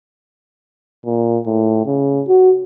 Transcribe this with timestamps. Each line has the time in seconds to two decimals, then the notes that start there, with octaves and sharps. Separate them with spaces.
1.05 A#2
1.47 A2
1.86 C#3
2.28 F#4